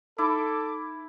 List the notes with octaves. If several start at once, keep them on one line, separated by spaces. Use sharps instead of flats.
D#4 E4 A4 D6